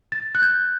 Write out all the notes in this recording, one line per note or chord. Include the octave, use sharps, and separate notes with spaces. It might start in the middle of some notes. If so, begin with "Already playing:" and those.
A6
F#6
G6